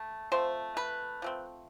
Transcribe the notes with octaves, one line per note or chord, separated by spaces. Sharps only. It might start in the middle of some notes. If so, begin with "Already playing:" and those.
Already playing: A3
F3 A3 C4 C5
B4
F3 A3 C4